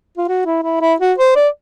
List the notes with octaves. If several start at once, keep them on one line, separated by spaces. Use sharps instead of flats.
F4
F#4
E4
E4
E4
F#4
C5
D5